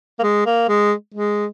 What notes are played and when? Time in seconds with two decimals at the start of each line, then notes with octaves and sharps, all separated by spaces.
0.19 A#3
0.23 G#3
0.46 A#3
0.69 G#3
1.14 G#3